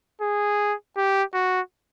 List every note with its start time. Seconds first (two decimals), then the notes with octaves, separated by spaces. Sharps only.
0.21 G#4
0.97 G4
1.34 F#4